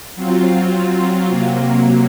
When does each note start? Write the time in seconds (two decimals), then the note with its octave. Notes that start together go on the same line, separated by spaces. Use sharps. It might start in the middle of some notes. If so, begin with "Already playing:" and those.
0.16 F#3 C4 F4
1.29 C3 F#3 A#3